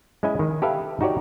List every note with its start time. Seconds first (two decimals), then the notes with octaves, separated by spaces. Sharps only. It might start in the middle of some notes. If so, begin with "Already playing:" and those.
0.23 G#3 C#4 E4 D#5 G#5
0.39 D#3
0.62 G4 A4 B4 E5 F5
1.01 D#4 F#4 G4 C#5 D5